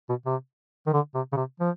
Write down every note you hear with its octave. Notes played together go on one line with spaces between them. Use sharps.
B2
C3
D#3
D3
C3
C#3
C3
F3